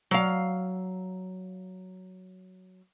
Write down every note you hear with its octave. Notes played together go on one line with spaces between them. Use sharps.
F#3 F5